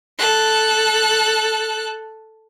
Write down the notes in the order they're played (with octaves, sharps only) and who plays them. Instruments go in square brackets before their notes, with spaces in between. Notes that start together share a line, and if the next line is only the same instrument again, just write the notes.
[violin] A4 F#6